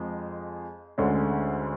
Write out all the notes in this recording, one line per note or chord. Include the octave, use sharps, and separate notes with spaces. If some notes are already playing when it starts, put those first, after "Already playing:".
Already playing: F2 F3 G#3
D2 D3 G#3 C#4